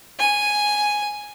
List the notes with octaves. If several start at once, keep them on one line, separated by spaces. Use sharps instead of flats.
G#5